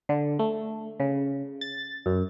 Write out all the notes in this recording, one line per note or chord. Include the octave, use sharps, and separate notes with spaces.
D3
A3
C#3
A6
F#2